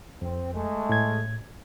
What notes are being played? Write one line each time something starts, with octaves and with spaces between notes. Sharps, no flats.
F2 C4
G#3 A3
A2 G#6